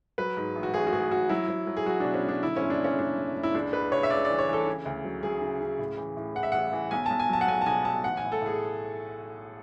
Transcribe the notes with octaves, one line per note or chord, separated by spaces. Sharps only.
F#3 B4
G#2
A1
F#4
A1 G#4
F#4
A1 G#4
A1 F#4
F#3 E4
F#3
F#3
G#4
F#3 F#4
B2 D4
C#4
F#3
D4
D3 E4
F#1 C#4
D4
F#1
C#4
F#1 D4
F#1
F#1
E4
C#2 D4
C#2 B4
C#2 C#5
E5
C#2 D5
E3 D5
C#5
E3 A4
C#3
D2
F#3
F#3 G#4
C#3
C#3
A2
E3
A2
E3 F#5
E5
A1 F#5
E3
B1 G#5
B1 A5
G#5
F#3 A5
F#5
B1 G#5
A5
B2 G#5
B1 A5
A1 F#5
G#5
A2
A4
A2 G#4